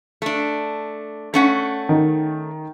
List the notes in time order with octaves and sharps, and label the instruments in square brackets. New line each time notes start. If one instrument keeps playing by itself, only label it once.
[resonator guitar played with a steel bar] A3 D4
A3 C#4 F#5
[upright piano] D#3